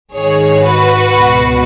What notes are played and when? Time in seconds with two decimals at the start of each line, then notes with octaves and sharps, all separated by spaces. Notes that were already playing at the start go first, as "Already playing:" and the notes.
0.13 G#1 G#2 D#3 G#4 C#5
0.62 F#4 B4
1.13 C#2 B2